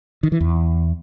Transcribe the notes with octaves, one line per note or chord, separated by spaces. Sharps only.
D#3
E3
E2